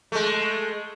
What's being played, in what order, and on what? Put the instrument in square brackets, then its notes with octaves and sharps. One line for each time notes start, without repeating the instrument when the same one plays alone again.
[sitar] G#3 A3